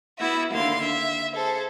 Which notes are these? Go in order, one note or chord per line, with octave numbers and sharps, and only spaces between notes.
B3 E4 F#4 E5
D#2 D3 F5 C6
E5
G#4 A4 C5